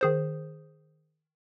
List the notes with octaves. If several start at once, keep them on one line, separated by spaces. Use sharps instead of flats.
D#3 G#4 C5